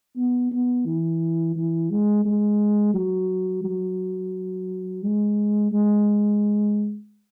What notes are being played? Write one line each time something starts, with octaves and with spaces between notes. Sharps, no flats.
B3
B3
E3
E3
G#3
G#3
F#3
F#3
G#3
G#3